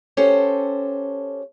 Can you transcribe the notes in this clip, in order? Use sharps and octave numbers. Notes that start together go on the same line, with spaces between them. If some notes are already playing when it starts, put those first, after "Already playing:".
C#4 G4 A4 C5